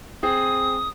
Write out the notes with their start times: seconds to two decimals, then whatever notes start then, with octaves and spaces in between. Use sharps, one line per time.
0.23 C4 G#4 D#6